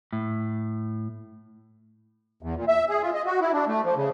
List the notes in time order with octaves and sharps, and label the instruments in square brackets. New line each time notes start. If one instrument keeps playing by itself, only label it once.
[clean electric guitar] A2
[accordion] E2
A#2
E5
G#4
F4
D#5
F#4
E4
D4
A3
F3
C#3